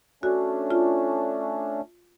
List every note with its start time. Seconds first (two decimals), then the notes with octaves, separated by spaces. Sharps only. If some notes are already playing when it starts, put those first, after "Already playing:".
0.23 A3 C#4 D4 F#4
0.71 F4